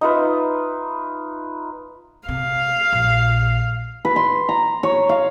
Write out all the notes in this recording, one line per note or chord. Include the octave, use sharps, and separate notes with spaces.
D#4 F4 B4 E5
C3 F5
A#1
B4
C6
A#5
C#5
F5